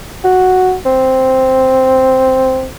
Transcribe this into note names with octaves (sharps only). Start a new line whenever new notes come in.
F#4
C4